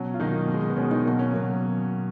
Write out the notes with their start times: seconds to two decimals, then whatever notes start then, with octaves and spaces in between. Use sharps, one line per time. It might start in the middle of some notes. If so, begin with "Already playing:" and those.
Already playing: B2 F#3 C#4
0.14 F4
0.20 B2 D#3 F#3 A#3 D#4
0.48 B2 G#3
0.70 B3
0.77 B2 G#3 C#4
0.91 D#3 D#4
1.06 B2 F#3 A#3
1.19 C#4
1.34 B2 F#3 A#3